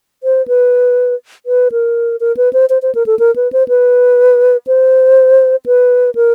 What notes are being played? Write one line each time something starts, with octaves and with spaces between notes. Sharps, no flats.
C5
B4
B4
A#4
A#4
B4
C5
C5
C5
A#4
A4
A#4
B4
C5
B4
C5
B4
A#4